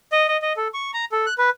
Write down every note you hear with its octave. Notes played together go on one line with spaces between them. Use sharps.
D#5
D#5
D#5
A4
C#6
A#5
A4
F#6
B4